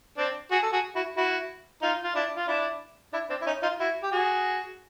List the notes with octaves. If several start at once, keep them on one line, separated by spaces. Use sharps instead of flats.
C4 D4
F#4 G#4
A4
F#4 G#4
E4 F#4
E4 F#4
D#4 F4
F4
D4 E4
F4
D4 E4
D4 E4
C4 D4
E4
C#4 D#4
D#4 F4
E4 F#4
G4
F#4 G#4